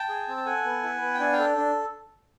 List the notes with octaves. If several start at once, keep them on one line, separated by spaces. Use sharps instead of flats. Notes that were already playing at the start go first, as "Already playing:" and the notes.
Already playing: G5 A5
G#4
C4
A5
A4 F#5 G#5
B3
E4
B3
G5
D4 F#5 G#5
F5 G5
A4
D4